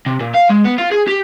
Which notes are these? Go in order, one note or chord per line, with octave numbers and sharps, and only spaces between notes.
C3
A#2
F5
G#3
B3
F4
G#4
G4